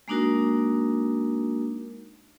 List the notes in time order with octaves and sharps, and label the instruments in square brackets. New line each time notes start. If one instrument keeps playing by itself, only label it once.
[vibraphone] G#3 A#3 D4 D#4 F#4 A#4